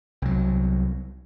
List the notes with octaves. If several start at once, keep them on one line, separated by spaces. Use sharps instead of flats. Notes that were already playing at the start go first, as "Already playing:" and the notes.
C2 F#3